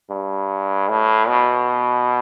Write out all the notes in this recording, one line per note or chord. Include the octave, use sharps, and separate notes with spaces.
G2
A2
B2